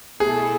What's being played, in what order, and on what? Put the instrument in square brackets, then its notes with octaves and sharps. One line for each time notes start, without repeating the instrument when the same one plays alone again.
[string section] B2 A3 E4 A4 [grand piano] G#4